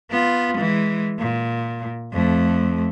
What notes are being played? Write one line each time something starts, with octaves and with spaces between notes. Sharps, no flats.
B3 F4
E3 G#3
A#2
F2 A3